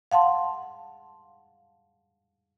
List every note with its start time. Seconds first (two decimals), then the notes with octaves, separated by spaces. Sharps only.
0.12 F5 F#5 A5 C6